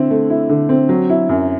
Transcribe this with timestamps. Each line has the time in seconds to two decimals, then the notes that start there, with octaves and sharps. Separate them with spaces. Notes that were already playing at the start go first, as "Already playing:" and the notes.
Already playing: D3 C4 E4
0.10 A3
0.30 E4
0.49 D3
0.69 C4
0.89 F#3
1.10 E4
1.29 F#2